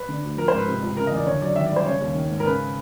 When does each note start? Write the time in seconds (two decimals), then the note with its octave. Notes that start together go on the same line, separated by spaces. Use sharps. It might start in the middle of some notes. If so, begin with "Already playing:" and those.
Already playing: B4
0.08 D3
0.23 D2
0.37 F3 A#4
0.48 C5
0.53 G#2 B4
0.68 C3
0.82 C#2
0.97 C#3 A#4
1.07 D#5
1.12 E2 D5
1.26 D3 C#5
1.41 F#2 D5
1.56 D#3 E5
1.66 D5
1.72 G2 C5
1.85 C#3 C#5
2.00 D#2
2.15 D#3
2.30 G#2
2.40 A#4
2.45 C#3 B4